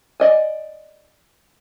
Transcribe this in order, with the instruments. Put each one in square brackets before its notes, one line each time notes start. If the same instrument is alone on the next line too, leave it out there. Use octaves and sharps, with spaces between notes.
[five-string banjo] D5 D#5 G#5